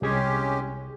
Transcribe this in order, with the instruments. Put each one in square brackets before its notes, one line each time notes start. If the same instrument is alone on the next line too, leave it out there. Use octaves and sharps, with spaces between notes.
[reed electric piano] C2 G#4 G#6 [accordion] G#3 C#4 G4